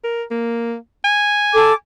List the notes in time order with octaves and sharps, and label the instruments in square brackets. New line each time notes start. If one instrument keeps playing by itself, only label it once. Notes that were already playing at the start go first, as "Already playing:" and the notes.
[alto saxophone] A#4
A#3
G#5
[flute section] A4 D6